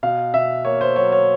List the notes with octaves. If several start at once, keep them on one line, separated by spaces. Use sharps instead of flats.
B2 F5
B2 E5
A#3 C#5
C5
F#3 C#5
C#5